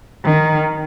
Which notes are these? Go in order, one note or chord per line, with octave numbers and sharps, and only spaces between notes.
D#3